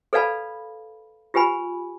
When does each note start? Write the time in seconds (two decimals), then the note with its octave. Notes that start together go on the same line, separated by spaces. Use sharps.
0.13 A4 B4 D5 F5 A5 B5
1.34 F4 G4 B4 G#5 B5